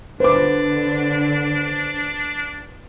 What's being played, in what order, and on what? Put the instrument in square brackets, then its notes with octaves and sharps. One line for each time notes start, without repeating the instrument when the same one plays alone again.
[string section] D3 [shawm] D4 [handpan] B4 [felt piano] C5 D6